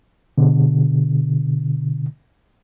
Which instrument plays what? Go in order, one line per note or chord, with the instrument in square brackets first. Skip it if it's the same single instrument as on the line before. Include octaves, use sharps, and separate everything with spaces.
[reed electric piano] B2 D3